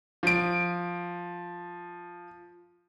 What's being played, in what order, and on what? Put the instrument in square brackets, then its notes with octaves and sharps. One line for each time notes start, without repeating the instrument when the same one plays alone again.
[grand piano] F3 D7